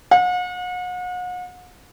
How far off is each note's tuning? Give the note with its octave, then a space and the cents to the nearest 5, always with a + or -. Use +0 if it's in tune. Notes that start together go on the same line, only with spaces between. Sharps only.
F#5 -40